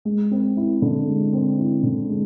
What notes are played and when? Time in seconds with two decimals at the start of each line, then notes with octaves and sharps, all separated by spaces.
0.05 G#3
0.31 C4
0.57 E4
0.82 D3
1.08 G#3
1.33 C4
1.59 E4
1.83 D3
2.10 G#3